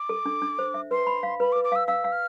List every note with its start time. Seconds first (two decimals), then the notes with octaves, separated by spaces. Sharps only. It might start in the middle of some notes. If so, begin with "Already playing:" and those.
Already playing: D6
0.09 A4
0.26 D4
0.42 D4
0.59 C5
0.74 E5
0.91 B4 C6
1.07 B5
1.23 F5
1.40 B4 B5
1.52 D6
1.56 B4
1.64 D6
1.72 F5 E6
1.88 F5 E6
2.04 F5
2.12 F6